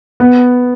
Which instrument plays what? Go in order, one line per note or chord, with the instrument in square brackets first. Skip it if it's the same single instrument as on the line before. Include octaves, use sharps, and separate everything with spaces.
[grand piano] B3